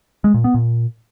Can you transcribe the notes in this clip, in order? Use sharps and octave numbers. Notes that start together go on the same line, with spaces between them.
G#3
A#2
B3
A#2